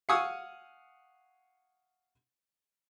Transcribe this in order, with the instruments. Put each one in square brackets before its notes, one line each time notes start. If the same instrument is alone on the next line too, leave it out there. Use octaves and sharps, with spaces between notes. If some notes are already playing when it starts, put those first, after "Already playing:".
[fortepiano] F5 F#5 G#5 C#6 D#6 E6